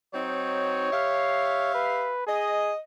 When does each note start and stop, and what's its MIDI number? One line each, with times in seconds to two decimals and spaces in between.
0.14 0.87 54
0.14 0.87 60
0.14 0.87 63
0.14 1.74 73
0.91 2.15 67
0.91 2.15 76
0.91 2.15 77
1.74 2.25 71
2.27 2.73 68
2.27 2.78 75